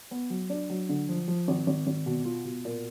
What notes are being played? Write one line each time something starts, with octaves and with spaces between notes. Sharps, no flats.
B3
F#3
D4
F#3
D3
F3
F3
G#1
G#1
G#1
B2
F4
B2
A#2